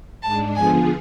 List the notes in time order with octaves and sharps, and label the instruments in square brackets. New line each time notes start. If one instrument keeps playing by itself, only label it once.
[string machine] G#2 G#3 D4 [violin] A5
[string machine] D3 F3 B3 F4 G#4 [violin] G#5